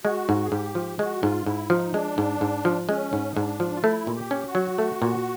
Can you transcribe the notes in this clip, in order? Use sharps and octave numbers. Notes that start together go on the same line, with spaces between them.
G#3 F#4
G#2
G#4
G#2 G4
F3
G#3 F#4
G#2 F4
G#2 E4
F3 D#4
G#3 D4
G#2
G#2
F3
G#3 C#4
G#2
D#4
G#2 D4
F3
F4
A3 E4
A#2
G4
C#4
F#4
F#3
A3
A#2